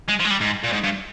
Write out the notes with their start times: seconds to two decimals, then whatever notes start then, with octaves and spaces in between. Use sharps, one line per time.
0.08 G#3
0.20 F3
0.25 G#3
0.30 G3
0.41 G#2
0.64 A#2
0.73 G#2
0.84 G2